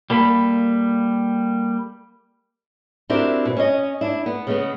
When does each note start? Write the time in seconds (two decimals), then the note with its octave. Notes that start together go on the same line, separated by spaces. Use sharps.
0.10 G3 A#3 A4 B5
3.10 C4 D4 E4 F#4 G4 A#4
3.45 B2
3.57 C#4 C#5 D#5
4.01 D4 E4
4.26 B3
4.47 C#3 G#3 B3